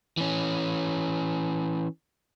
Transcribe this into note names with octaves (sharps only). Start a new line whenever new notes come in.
E3 C#4